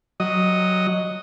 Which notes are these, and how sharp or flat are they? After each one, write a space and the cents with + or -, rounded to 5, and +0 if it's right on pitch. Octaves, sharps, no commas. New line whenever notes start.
F#3 +0 D#5 +0